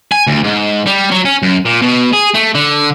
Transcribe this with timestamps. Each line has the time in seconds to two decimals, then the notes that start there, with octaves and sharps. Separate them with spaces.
0.12 G#5
0.27 D2
0.44 G#2
0.87 G3
1.11 F#3
1.25 C#4
1.43 F#2
1.65 A#2
1.82 B2
2.13 G#4
2.34 A3
2.55 D3